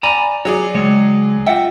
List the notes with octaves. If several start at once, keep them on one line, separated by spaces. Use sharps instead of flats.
D5 G#5 A#5 B5
F#3 G#4 C#5 D5
C#2 G#3 C#5
F4 E5 F#5 G5